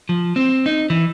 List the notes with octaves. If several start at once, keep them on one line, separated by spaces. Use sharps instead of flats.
F3
C4
D#4
E3